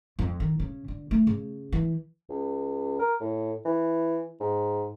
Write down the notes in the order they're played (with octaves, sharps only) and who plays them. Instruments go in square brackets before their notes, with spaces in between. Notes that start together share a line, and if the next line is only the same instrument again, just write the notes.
[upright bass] F2
D#3
C#3
D3
A3
C#3
E3
[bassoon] C#2
A#4
A2
E3
G#2